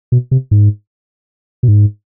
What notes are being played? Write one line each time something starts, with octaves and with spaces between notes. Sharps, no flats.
B2
C3
G#2
B2
G#2